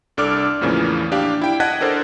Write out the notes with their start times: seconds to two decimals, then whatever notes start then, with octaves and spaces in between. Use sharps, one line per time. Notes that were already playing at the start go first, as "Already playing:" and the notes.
0.17 C2 D4 A4 D5 D6 F6
0.61 E2 A2 C#3 E3 F3 A#3
1.12 D4 G4 F5
1.42 E4 G5 D7
1.60 D#5 F#5 A5 F#6 G#6 B6
1.81 D4 A4 A#4 C5 D5